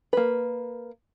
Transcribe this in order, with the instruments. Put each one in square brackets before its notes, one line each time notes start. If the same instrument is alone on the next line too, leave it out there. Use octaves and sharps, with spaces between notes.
[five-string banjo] A#3 B4